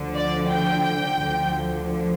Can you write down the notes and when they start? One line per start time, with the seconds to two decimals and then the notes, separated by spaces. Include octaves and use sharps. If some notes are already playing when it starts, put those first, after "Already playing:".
Already playing: D2 D3 F3
0.14 D5
0.50 G5
1.24 D2 D3 F3